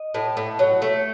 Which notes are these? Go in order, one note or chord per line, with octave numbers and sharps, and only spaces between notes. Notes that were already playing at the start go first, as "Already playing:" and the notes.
Already playing: D#5
A2
A2
F#3
A3